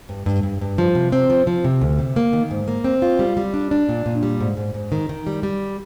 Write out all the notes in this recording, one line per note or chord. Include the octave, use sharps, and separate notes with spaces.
G2
G2
G2
G2
F3
C3
C4
F3
F3
C3
D2
C3
A#3
D#3
G#2
A#3
C4
F4
G3
G3
D4
D4
A#2
A#2
G3
G#2
G#2
G#2
D#3
D#3
G3
G3